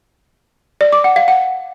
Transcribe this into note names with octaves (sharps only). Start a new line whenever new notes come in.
D5
D6
F#5
F5
F#5